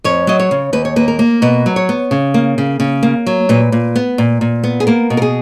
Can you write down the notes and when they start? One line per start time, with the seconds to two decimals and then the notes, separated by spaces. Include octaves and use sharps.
0.04 F2 C#5
0.27 F#3 D#5
0.40 C#5
0.51 C#3
0.73 D#2 B4
0.85 C#5
0.96 A#3 B4
1.08 A#4
1.19 A#3
1.42 B2 B4
1.66 F#3
1.76 C#5
1.89 B3
2.11 C#3
2.34 A#3
2.58 C#3
2.80 C#3
3.03 A#3
3.26 F#3
3.49 A#2 B4
3.72 A#2
3.96 B3
4.18 A#2
4.41 A#2
4.64 B3
4.80 G#4
4.87 A#3 A#4
5.10 B2
5.17 A#4
5.22 G#4